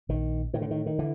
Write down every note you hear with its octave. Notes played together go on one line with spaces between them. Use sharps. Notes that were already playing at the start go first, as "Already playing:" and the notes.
A#1 D#3
A2 D#3
D3
D#3
D#3
D3 E3